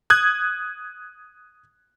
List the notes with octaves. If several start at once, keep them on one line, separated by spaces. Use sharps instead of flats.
D#6 F#6 G#6